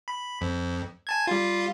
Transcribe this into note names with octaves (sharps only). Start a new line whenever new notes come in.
B5
F2
G#5 A5 G#6
G3 F4